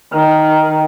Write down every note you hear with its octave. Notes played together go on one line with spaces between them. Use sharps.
D#3